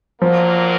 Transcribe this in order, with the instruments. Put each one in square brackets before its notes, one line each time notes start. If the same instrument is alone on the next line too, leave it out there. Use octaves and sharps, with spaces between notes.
[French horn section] A#2 F#3 A#3 [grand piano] F3